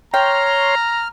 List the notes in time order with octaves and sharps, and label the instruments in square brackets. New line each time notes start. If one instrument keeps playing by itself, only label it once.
[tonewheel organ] C#5 C6 [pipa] G5 [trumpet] A#5 [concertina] F6